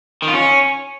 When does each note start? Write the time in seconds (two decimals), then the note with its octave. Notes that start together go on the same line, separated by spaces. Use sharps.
0.22 D#3
0.28 F4
0.33 C#4